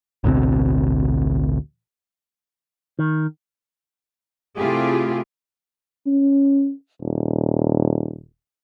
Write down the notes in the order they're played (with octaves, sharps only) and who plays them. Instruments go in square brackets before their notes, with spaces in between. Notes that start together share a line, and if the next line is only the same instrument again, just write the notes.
[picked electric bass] A1 D2 B2 C4
[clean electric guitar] D#3
[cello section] C3 A3 E4 F4 G4 G#4
[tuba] C#4
D#1